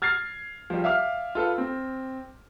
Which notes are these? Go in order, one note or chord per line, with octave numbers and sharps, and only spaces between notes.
F6 G#6 A6 C7
F3 G3
E5 F5 D6 F6
F4 A4 B4
C4